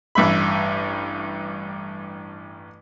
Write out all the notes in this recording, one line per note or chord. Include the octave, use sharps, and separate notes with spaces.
A1 G2 E5 B5